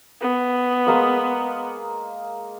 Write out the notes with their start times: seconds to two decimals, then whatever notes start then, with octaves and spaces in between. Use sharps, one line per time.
0.21 B3
0.87 G#3 A#3 D#6